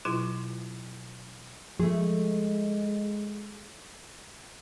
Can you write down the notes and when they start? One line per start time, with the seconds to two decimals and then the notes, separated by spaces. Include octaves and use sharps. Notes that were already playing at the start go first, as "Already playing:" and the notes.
0.05 B2 F#3 E4 F4 B4
1.80 F3 G#3 A3 G#4